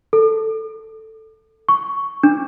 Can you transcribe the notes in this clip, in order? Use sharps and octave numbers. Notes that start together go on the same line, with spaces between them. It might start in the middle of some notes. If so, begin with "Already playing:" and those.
A4
C#6
D4